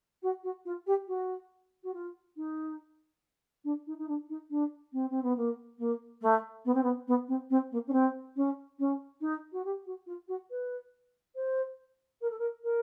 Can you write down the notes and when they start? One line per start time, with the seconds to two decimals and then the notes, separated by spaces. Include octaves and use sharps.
0.22 F#4
0.43 F#4
0.65 F4
0.86 G4
1.07 F#4
1.83 F#4
1.93 F4
2.36 D#4
3.64 D4
3.86 D#4
3.98 D#4
4.08 D4
4.29 D#4
4.49 D4
4.92 C4
5.09 C4
5.22 B3
5.36 A#3
5.78 A#3
6.21 A3
6.64 B3
6.73 C4
6.82 B3
7.07 B3
7.27 C4
7.50 C4
7.71 A#3
7.87 C#4
7.92 C4
8.36 C#4
8.79 C#4
9.20 D#4
9.52 F#4
9.64 G4
9.85 F#4
10.06 F4
10.27 F#4
10.50 B4
11.35 C5
12.21 A#4
12.30 A4
12.38 A#4
12.63 A#4